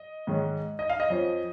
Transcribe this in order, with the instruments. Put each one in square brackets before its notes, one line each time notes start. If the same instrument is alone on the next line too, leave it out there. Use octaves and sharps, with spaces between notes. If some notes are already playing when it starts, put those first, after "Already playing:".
Already playing: [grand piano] D#5
G#2 D#3 G#3 C#4
D#5
F5
D#5
F2 F3 C#4